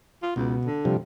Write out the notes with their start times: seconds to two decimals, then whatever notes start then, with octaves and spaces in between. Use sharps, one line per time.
0.23 F4
0.36 C#2 B2
0.65 D3
0.85 C3 F3 G3